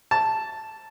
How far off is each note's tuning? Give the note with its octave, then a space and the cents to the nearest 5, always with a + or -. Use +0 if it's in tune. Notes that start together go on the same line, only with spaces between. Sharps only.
A5 +0